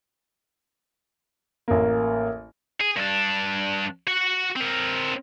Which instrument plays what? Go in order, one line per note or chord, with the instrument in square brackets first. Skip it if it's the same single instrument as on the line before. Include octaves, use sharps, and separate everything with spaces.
[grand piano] A1 A#3
[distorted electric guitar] G#4
G2 D4
F#4 F#5
C4 A#4